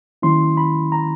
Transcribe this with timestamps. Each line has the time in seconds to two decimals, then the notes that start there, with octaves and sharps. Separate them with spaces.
0.22 D#3 F#3 A#3 C#4 E4 C6
0.57 B5
0.92 A#5